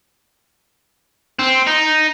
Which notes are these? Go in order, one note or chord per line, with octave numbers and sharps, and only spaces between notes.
C4
D#4